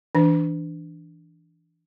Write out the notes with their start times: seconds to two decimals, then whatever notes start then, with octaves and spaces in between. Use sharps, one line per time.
0.15 E3 D4